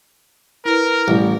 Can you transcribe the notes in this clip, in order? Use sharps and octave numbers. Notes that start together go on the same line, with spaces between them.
E4 A#4 B4
A1 G3